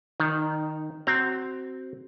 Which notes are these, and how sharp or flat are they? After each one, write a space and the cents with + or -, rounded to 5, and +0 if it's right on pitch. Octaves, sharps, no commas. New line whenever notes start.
D#3 +0 D#4 -25
C4 +0 F#4 +20 A#5 +0